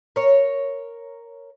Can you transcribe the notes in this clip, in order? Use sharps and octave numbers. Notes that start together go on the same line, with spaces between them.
A#4 C#5